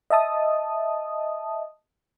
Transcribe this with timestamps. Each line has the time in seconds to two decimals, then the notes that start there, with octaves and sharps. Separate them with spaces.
0.10 D#5 E5 A5 D#6